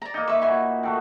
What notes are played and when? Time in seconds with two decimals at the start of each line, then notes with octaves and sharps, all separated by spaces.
0.02 D5 A#5
0.14 A#3 D#4
0.27 B4 E5 C#6
0.42 A#2 F#4 E5 G#5 B5
0.83 D#3 A3 F#4